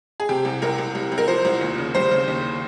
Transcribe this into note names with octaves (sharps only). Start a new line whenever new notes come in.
G#4
C3 G4
C2
C2 A#4
C2
C2
C2
A#4
F3 C5
C2
D#2
C#3
G3 C5
C#3
D#2